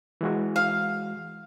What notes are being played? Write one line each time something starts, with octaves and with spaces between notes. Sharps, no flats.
E3 G#3 F#4
F5